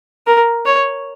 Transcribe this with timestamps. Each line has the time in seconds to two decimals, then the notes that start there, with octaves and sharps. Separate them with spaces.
0.27 A#4
0.66 C#5